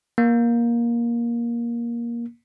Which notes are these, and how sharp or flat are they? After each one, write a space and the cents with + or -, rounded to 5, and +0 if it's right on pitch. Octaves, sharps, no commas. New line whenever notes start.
A#3 +15